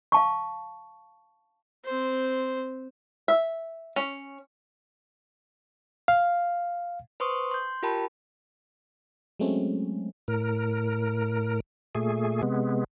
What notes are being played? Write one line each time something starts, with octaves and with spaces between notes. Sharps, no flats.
F5 A5 C#6
C4 C5
E5
C#4
F5
B4 C5 C6 C#6 D#6
C6 G6
F4 G4 A#4 G5 A5 B5
F#3 G#3 A3 C4 C#4
A2 A#4
A#2 A3 G#4
C3 G#3 B3